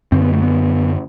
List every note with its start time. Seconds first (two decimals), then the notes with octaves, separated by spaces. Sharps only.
0.12 F#2 D3 C4
0.22 B3
0.33 A3
0.42 B3